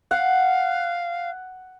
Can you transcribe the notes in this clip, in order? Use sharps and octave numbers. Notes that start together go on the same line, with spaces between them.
F5 F#5